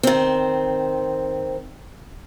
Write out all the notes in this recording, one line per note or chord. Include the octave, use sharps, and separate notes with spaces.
D#3 C4